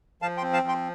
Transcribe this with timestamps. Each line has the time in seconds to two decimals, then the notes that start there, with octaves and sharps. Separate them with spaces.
0.22 F3 F5 A5
0.37 G5 C6
0.42 C4
0.53 F5 A5
0.63 F3 G5 C6